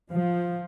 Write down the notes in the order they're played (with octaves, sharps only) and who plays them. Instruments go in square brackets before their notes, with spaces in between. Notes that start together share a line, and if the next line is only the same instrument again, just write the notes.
[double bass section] F3